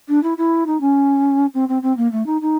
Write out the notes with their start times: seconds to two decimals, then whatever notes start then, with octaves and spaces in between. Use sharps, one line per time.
0.08 D4
0.23 E4
0.37 E4
0.66 D#4
0.80 C#4
1.54 C4
1.68 C4
1.82 C4
1.96 A#3
2.12 A3
2.26 D#4
2.41 D#4